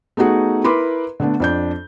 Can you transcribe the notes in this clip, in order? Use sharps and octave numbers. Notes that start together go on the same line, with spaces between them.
A3 B3 D#4 F#4 G#4
E4 A#4 B4 B5 C6 D6
D3 A3 B3 D4
F2 D4 G6